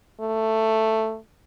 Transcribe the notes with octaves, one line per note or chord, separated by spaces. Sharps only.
A3